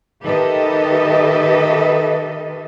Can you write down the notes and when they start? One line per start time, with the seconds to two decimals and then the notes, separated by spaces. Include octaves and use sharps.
0.24 D#3 G4 A4 B4 D#5 E5